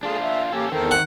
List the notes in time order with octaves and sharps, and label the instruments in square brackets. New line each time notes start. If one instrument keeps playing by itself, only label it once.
[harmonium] A3 G#4 A5 [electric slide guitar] D4 F4
[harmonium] E5
[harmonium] A#3 G4 [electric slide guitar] C#4 A4
[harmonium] E2 A4 A#4 [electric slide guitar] D#3 C4
[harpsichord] F#5